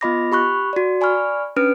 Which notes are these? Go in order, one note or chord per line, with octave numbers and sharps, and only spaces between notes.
B3 F4 D#5 B5 D6 A#6
G4 B5 C#6 F#6
F#4 D5
D5 G#5 B5 C#6 F6
C#4 D4 B4 F6 D7